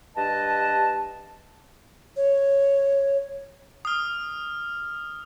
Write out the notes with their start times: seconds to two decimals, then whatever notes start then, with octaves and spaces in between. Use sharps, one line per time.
0.16 G2 B4 D#5 A5
2.16 C#5
3.85 D#6 F6